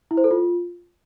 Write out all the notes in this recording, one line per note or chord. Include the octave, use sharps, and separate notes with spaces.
E4
C5
A4
F4